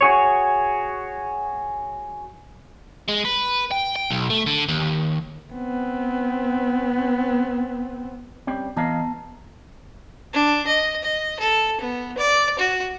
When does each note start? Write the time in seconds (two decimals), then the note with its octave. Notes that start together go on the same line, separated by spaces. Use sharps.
0.01 F#4 G#4 C#5
3.09 G#3
3.25 B4
3.72 G5
3.96 G5
4.10 B1
4.30 A3
4.46 D3
4.68 D#2
5.53 B3 C4
8.47 G3 C4 C#4
8.77 E3 B3 D#5 F5 A5 A#5
10.33 D4
10.67 D#5
11.03 D#5
11.40 A4
11.80 B3
12.18 D5
12.59 F#4